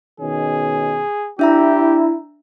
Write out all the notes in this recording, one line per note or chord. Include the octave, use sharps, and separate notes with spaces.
B2 D#3 C#4 G#4
D4 E4 G4 E5 A#5